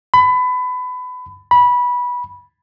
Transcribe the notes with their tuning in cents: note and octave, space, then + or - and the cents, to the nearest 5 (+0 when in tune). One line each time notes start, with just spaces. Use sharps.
B5 +25
B5 -15